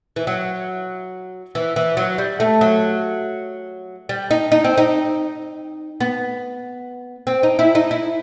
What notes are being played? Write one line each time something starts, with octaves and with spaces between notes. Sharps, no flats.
E3
F#3
E3
E3
F#3
G3
A3
F#3
G3
D#4
D#4
C4
D#4
B3
C4
D#4
E4
D#4
E4